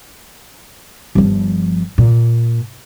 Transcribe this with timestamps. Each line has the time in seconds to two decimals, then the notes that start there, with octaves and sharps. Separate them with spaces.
1.15 G1 F3
1.98 A#2